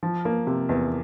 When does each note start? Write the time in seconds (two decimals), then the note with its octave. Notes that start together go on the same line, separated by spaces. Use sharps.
0.03 F3
0.25 A#3
0.47 C3
0.69 E2